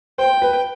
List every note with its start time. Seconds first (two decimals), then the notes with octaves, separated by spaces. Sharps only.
0.18 C5 G5
0.42 B4